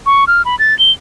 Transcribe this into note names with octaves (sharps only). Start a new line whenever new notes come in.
C#6
F6
B5
A6
G7